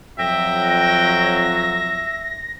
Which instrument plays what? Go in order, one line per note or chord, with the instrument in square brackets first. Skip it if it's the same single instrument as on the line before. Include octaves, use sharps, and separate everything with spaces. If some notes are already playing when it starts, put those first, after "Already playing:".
[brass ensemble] F2 F#3 [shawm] E5 [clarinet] G5 [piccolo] A#6